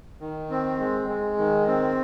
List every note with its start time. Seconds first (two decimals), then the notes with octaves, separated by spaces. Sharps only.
0.21 D#3
0.50 C4
0.80 G#3
1.08 G#3
1.38 D#3
1.67 C4